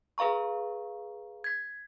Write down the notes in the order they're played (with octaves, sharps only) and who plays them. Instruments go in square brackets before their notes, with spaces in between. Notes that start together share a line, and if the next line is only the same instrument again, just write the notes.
[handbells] G#4 B4 F5 A#5 C#6
G#6 B6